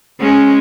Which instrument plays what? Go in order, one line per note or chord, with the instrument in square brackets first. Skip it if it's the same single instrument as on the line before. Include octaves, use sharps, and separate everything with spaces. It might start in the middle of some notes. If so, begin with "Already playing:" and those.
[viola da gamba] G#3 C#4